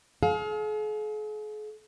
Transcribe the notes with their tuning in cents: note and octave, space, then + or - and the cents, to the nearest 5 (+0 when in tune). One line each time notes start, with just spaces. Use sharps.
G#4 +45 F5 +25